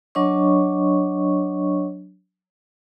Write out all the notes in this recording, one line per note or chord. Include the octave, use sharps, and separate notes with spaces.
F#3 D4 C#5 D#5 C#6